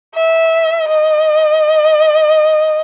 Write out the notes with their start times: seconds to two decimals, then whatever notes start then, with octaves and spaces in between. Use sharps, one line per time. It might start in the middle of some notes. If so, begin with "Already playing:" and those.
0.15 E5
0.88 D#5